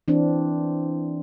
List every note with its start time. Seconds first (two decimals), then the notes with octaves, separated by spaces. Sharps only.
0.08 E3 C4 D4